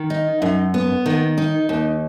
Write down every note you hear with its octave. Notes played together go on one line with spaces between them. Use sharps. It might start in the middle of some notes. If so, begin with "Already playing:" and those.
Already playing: D#3
D#4
F#2
B3
D#3
D#4
D#2